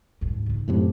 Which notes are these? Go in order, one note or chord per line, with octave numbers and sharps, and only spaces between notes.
D2 G#2
C#3 D#4
F#2 A2 C3